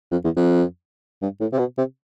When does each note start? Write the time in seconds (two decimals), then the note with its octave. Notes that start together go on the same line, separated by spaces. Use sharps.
0.11 F2
0.24 E2
0.36 F2
1.22 G2
1.40 A2
1.52 C3
1.59 B2
1.78 C3